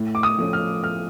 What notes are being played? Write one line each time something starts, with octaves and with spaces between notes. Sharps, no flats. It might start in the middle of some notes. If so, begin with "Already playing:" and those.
Already playing: A2
D6
D#6
F3 A3 C#4
F6
A2 F6